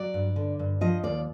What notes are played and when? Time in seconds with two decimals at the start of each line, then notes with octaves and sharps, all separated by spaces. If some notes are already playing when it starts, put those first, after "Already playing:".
Already playing: F#3 D5
0.14 G2
0.36 D3
0.59 G2
0.81 F3 D#5
1.03 D#2 D5